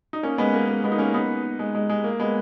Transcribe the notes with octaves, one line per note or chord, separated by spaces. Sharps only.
D#4
A#3 C#4
G#3 B3
A#3
A#3
G#3 B3
D#4
A#3 C#4
B3 D#4
G#3
G#3
G#3
A#3
G#3 B3